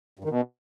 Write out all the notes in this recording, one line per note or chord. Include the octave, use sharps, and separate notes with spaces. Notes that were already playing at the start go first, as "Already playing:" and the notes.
G2
D#3
B2